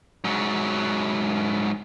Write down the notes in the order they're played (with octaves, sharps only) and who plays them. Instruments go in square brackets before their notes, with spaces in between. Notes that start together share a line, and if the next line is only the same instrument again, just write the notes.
[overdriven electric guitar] G#2 F#3